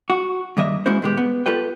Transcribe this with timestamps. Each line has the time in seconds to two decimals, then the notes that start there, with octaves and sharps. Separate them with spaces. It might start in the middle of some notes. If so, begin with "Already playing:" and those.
0.10 F#4
0.57 G2 D#3 A#3 D#5 E5
0.86 G#3 A#3 C#4 E4 F#4 C5
1.02 A#2 D#3 G#3 B3 G4
1.17 B3
1.46 F4 G4 A4 B4 G5